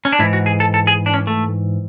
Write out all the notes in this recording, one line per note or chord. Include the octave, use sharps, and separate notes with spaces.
C#4
D4
G#2 E3 E4
F#4
G#4
A4
A4
G#4
D4
C#4
A3